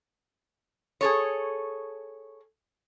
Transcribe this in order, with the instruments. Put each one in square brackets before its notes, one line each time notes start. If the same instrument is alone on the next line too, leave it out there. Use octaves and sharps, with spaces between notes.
[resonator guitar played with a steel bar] G#4 A4 C#5